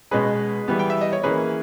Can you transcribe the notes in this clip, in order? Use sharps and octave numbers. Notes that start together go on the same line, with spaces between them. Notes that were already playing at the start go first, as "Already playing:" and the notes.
B2 G#3 C#4 G#4 B4
E3 G3 B3
G5
E5
D#5
C#5
E3 A#3 C#4 G#4 B4